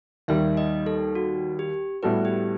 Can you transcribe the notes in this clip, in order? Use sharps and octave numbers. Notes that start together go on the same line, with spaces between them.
D#2 D#3 G3 E5
D#5
A4
F#4
G4
A2 G3 B3 F#4 A4 B4
G4